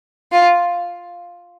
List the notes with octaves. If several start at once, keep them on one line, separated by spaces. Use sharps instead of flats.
F4